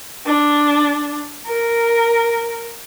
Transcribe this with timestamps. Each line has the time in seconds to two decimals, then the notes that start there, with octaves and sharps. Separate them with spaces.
0.26 D4
1.47 A#4